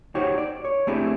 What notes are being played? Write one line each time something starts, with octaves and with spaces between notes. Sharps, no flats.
D#4 F#4 G4 C5 C#5
D5
C#5
A3 C4 D4 E4 G4 G#4